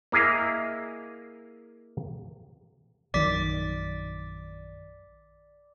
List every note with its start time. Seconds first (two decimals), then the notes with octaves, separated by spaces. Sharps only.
0.12 A#3 E4 G#4 D#5 F5
3.14 A#1 F#2 D#3 D5 D6 B6